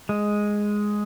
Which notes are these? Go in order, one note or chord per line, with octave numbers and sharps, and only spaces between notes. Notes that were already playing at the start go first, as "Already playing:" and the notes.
G#3